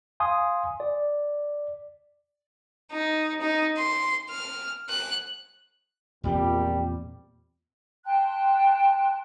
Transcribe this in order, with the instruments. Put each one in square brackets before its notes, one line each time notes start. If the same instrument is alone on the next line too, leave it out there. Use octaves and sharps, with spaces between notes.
[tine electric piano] F5 G#5 C6 D#6
D5
[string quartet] D#4
D#4
C6
F6
F#6
[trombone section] A#1 G3 [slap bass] E2 A#2 C4
[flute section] G5 A5 C6 F#6